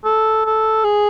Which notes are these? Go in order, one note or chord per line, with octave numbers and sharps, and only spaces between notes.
A4
A4
G#4